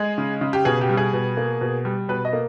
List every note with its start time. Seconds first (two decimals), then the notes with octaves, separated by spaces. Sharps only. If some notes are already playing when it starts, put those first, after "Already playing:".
Already playing: G#3 G#4
0.18 C#3
0.41 C#3
0.53 G4
0.65 B2 G#4
0.81 G4
0.89 G3
0.97 G#4
1.13 B2
1.37 A#3
1.61 B2
1.85 G3
2.09 B2 B4
2.25 D#5
2.33 A#3